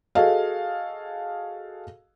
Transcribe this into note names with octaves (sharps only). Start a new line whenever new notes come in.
F#4 G#4 A4 D#5 F5